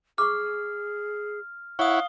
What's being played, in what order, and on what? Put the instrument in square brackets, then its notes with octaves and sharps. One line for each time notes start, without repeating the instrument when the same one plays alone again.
[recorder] G#4 [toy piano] C#6 D6 [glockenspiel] F6
[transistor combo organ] E4 C#5 F#5 [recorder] F5 [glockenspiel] D#6 G7